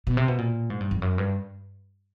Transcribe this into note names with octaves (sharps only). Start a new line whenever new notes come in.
B2
C3
B2
A#2
G#2
G2
F2
F#2
G2